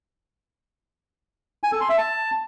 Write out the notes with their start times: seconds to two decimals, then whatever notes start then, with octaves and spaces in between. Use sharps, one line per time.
1.63 G#5
1.72 A4
1.81 C6
1.89 E5
1.98 A5